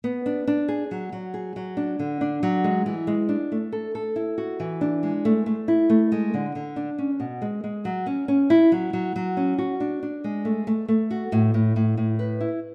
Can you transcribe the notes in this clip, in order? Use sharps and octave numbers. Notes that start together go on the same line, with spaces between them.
B3
D4
D4
G#4
F#3
F#3
G#4
F#3
D4
D3
D4
F#3
G#3
E3
G#3
D4
A3
A4
A4
E4
F#4
E3
D4
G#3
A3
A3
E4
A3
G#3
D3
D3
D4
C#4
B2
G#3
G#3
F#3
C#4
C#4
E4
F#3
F#3
F#3
C#4
F#4
D4
D4
G#3
A3
A3
A3
F#4
A2
A2
A2
A2
B4
E4